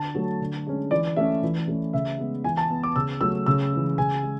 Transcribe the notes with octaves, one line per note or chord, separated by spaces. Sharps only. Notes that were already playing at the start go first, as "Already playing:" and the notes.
Already playing: D3 A5
F#3 A3
D3
G#3 C#4
E3 D5
A3 C#4 E5
E3
A3 C#4
C#3 E5
G#3 B3
E3 G#5
A5
B3
D6
C#3 E6
F#3 A3 E6
C#3 E6
E3 G#3
C#3 G#5
G#3